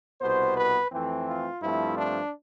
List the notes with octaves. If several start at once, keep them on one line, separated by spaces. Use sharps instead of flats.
C2 B2 B3 C5
B4
F2 E3 A3 C4
F4
G2 F3 A3 C4 E4
D4